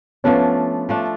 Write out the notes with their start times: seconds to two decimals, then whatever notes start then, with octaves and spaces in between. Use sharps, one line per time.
0.24 F3 A3 B3 C#4 D4
0.89 F3 A3 D4